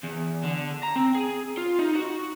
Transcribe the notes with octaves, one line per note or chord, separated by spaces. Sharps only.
E2
D3
A#5
C4
G#4
F4
D#4
F#4